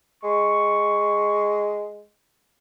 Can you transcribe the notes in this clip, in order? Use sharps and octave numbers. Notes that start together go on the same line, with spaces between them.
G#3 C#6